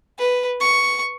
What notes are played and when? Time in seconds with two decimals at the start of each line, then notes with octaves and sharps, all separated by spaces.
0.18 B4
0.61 C#6